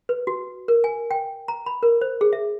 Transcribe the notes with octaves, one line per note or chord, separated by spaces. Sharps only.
B4
F#4
A#4
G#5
G5
A#5
B5
A#4
C5
G#4
E5